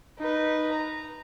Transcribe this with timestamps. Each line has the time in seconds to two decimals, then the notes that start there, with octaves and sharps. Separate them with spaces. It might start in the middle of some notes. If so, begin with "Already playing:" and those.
0.18 D#4 B4
0.72 A#5